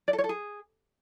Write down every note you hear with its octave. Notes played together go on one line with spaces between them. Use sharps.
D5
A4
C#5
A4
G#4